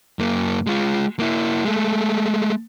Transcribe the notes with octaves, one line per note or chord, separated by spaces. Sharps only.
F#2 A#3
G#3 F4
A#3 E4
G#3 A3